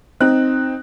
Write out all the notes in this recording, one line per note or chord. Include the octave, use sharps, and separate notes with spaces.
C4 D#4 F#6